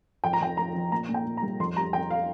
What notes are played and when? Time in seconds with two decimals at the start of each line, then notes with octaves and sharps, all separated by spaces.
0.24 F2 G5
0.33 A#5
0.41 F2 G5
0.57 F3 A#5
0.75 F3
0.91 A#2 A#5
1.09 A#2
1.14 G5
1.25 A#2
1.37 A#5
1.43 C2
1.60 F2 C6
1.76 G3 A#5
1.93 F2 G5
2.10 F5